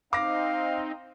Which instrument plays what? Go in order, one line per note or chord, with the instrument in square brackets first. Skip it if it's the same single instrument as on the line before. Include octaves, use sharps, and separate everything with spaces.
[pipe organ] C4 D#4 [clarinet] F5 [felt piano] D6 A#6